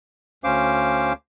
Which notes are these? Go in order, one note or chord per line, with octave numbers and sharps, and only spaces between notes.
D2 C#4 C5 F5 D6